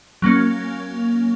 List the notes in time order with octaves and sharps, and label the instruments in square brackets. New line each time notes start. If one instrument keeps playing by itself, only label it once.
[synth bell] F#3 A#3 C#4